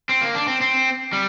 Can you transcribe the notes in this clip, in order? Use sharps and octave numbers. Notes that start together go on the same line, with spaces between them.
C4
A#3
D4
C4
C4
G3